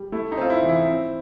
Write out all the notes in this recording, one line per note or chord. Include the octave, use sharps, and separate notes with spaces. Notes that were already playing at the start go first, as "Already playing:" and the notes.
Already playing: G3
A3 E4
D#4
C4 F4
E4
E3
E4
C4